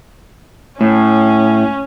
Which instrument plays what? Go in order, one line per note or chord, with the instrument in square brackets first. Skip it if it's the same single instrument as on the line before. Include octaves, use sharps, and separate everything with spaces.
[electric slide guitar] A2 [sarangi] C#4